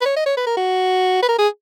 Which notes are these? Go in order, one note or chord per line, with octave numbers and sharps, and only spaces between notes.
B4
C#5
D#5
C#5
B4
A#4
F#4
B4
A#4
G#4